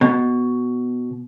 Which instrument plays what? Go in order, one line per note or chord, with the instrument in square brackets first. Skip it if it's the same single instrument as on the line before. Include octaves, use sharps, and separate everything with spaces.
[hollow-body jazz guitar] B2